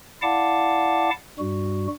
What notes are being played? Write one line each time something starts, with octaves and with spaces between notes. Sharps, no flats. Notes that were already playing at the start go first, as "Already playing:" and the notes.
E4 D5 F5 F#5 A5 D6
G2 G3 F#4